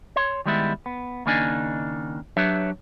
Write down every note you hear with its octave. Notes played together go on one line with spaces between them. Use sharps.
C#5 C6
D#3 G3 G#3 B3 E4
B3
D#2 C#3 A#3 D4 D#4 G#5
F#3 D4 G4 B4 C#5 E5